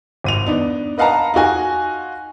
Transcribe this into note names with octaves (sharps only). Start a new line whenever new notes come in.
G#1 D#7 F7
B3 D4 D#4
B4 D#5 F5 F#5 A5 A#5
D#4 F4 F#4 G#5